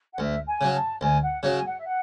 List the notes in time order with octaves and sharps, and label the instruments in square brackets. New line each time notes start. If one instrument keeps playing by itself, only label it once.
[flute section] F#5
[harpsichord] D2 [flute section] E5
[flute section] G#5
[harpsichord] C#3 F#3
[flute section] A5
[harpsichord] D2 [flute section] G#5
[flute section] F#5
[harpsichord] C#3 F#3
[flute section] G#5
F#5
E5
F#5